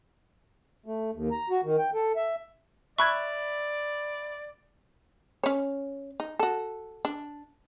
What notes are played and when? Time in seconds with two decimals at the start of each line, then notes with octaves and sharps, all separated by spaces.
0.86 A3
1.14 D#2
1.31 A#5
1.50 F#4
1.64 D#3
1.78 G5
1.94 A4
2.16 E5
2.98 D5 E5 B5 C#6 F#6 G#6
5.43 C#4 C#5
6.20 D#4
6.39 F#4 A4
7.05 D4